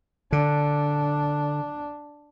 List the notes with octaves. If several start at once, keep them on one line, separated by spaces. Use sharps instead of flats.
D3 D4